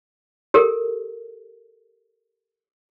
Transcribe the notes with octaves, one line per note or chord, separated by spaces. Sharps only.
G4 A4 A#4